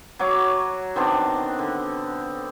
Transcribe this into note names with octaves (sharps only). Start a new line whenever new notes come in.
F#3 F#4 C#5 D6
D#3 B3 C4 D4
D3